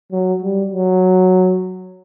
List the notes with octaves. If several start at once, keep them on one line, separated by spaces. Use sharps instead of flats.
F#3
G3
F#3